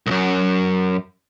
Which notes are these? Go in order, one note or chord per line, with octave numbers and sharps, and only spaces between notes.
C2 F#2